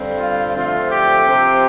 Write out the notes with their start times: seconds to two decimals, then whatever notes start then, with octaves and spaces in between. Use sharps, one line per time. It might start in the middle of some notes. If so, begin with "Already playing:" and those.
Already playing: G2 D3 G3 C4
0.18 F4
0.54 D3 F3 A3 C4 F4
0.91 G4
1.26 C3 F3 C4